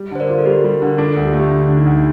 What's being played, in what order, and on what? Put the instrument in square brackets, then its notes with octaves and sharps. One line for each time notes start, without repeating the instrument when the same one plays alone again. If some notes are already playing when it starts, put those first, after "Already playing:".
Already playing: [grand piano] G3
[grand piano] D3 [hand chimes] C5
[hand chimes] A#4 D5
[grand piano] F4
[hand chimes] A4
[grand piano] G3 [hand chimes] G4 A#4
[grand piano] G3
D3
[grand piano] D4 [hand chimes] F4 A4
[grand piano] D2
[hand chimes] G4
[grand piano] A3 [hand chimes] F4
[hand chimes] G4
[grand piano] D3 [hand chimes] F4
[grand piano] D3
[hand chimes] D#4
[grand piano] D2
[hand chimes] G4